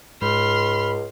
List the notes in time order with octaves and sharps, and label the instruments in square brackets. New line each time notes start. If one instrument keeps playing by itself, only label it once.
[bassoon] C#2 [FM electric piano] G#2 [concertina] B5 [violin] C6 F6